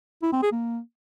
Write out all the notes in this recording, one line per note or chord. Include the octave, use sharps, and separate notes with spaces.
E4
C4
G#4
A#3